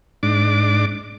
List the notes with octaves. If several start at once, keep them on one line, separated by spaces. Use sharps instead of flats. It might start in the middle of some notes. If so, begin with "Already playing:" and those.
G#2 D4 D6